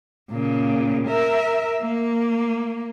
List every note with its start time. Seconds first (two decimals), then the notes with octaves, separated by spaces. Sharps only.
0.31 A#2 C#3
1.07 A#4 E5
1.82 A#3